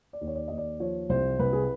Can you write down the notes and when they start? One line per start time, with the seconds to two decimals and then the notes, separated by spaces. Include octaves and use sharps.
0.13 D5
0.21 D#2
0.27 C#5
0.36 D5
0.48 D#2 D#5
0.58 D5
0.80 F3 C#5
1.09 C2 C5
1.39 C2 B4
1.53 G#4